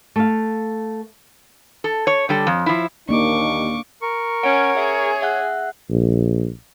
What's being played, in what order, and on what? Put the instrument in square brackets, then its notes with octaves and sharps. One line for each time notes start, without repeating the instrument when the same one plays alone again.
[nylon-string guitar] A3 F5
[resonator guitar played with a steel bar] A4
C#5
D3 G3 A4
F2
F3 E4
[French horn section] D#2 D#4 [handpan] A#3 D4 [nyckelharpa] C#6 D6
[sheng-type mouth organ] A#4 C#6
[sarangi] C#4 [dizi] C#5 [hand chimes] F#5 D7
[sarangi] G#4 [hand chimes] E5
[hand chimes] E5 F#5 F#6
[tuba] A#1